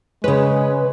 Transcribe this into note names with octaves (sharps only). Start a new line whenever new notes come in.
C#3 G#3 B4 C#5